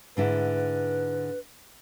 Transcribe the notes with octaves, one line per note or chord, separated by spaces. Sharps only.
G#2 D3 E4 B4